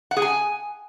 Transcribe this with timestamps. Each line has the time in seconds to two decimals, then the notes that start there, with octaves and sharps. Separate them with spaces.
0.11 F#5
0.17 G#4
0.22 G#5